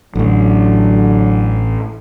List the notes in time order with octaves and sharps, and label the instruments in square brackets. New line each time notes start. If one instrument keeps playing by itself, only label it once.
[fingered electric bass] A1 A2 [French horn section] D3 F#3